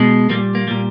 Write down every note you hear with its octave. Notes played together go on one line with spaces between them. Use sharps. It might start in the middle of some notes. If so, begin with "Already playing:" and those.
Already playing: B2 G#3
A#2 G3 A#3
A#3
A#2 G3